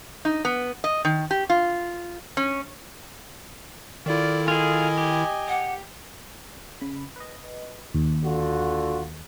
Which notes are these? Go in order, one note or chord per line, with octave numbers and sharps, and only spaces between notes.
D#4
B3
D#5
D#3
G4
F4
C#4
D#3 E4 F4 A4 D5
F4 G#4 D#5 G#5
G4
F#5
C#3 B5
B4 D#5
D#2
D3 F4 F#4